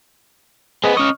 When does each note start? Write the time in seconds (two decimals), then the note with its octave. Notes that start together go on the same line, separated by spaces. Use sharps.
0.84 C4 G#4 B4 D#5
0.97 C#4 D#5 C#6 F6